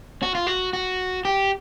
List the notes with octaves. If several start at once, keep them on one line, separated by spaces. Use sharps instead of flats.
F#4
F4
F#4
F#4
G4